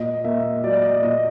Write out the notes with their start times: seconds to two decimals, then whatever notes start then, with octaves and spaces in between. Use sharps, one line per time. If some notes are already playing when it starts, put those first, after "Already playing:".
Already playing: A#2 D#5
0.24 A#3 E5
0.64 F#3 D5
0.83 D#5
1.02 A#2 D#5